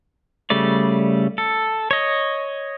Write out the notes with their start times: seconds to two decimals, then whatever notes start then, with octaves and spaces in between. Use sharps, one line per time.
0.50 C#3 G3 A3 D5
1.38 A4
1.91 C#5 D#5